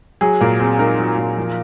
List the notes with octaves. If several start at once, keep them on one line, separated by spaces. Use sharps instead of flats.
F#3 G#4
A#2 A#4
C4 G#4
D#4 A#4
F#3
A#2
F3